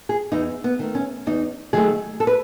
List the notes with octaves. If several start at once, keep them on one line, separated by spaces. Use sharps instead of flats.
G#4
E2 D#4
B3
D#3 A3
C#4
E2 D#4
D#3 F#3 A3 G#4
A4
B4